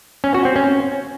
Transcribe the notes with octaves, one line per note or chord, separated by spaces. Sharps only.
C#4
F#4
C4
C#4